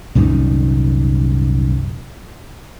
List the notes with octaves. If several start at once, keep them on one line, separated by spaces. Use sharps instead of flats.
C2 F#2 A#2 D#3